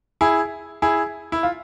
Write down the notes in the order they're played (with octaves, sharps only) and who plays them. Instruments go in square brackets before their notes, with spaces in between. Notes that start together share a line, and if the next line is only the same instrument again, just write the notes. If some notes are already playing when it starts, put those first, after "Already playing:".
[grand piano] E4 G#4
E4 G#4
E4
F4